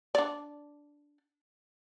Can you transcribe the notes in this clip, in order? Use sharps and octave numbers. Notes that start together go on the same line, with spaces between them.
D4 D5